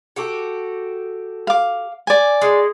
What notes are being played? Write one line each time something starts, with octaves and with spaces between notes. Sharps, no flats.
F#4 G4 A4
F5 D6
D5 G#5
G#3